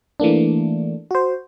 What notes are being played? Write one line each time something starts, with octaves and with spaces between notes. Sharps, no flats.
E3 A3 A#3 D4
F#4 C5